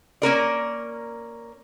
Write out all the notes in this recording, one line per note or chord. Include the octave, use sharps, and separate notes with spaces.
A#3 C#4 A#4 D5